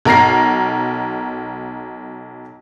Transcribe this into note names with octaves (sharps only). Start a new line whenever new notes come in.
B1 A#4 A#5 A#6 C7